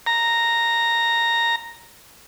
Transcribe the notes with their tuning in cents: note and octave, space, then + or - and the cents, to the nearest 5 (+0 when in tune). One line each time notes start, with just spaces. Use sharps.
A#5 -5